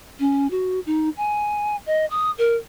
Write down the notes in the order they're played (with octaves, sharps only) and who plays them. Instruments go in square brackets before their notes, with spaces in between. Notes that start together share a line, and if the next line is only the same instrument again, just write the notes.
[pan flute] C#4
F#4
D#4
G#5
D#5
D#6
A#4